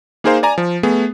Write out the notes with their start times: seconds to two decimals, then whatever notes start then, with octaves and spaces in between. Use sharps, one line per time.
0.24 A#3 D#4 G#4 A#4 C5 F5
0.43 D5 G#5 A#5
0.58 F3
0.83 A3 B3 G#4